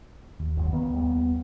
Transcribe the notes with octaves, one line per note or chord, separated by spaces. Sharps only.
D#2
G1 F#2
C#2 D#3 A#3 B3
D#2 G3